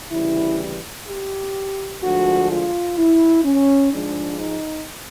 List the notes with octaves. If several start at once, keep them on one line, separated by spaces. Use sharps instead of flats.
D2 C#3 E3 G3 E4
G4
D2 D3 F3 G#3 F#4
F4
E4
C#4
G#2 F3 G#3 D4
D#4